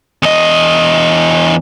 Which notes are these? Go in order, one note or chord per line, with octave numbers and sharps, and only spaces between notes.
E2 D#5